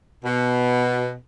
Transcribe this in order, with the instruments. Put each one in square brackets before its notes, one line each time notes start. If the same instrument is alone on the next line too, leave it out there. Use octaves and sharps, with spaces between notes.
[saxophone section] B2